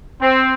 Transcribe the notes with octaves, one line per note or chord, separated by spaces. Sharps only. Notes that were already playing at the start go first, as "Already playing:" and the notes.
C4